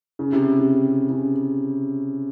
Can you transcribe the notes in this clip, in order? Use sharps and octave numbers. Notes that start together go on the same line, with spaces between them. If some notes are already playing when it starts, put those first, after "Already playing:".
C#3
C3
C3
C#3